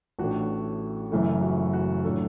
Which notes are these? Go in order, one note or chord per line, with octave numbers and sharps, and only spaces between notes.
A1 A2 A3 D4 F#4
F#1 F#2 E3 A3 E4
F#4
F#4
A2 F#3 D4 A4